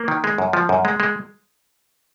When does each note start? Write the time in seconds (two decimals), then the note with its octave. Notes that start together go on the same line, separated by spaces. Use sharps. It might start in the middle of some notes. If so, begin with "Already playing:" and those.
Already playing: A#3
0.08 D#3
0.24 G#3
0.38 F#2
0.53 F3
0.69 F#2
0.85 G#3
1.00 G#3